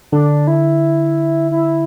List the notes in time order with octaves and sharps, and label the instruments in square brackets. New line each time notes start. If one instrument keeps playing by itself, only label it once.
[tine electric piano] D3 [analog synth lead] D4
[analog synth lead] E4
E4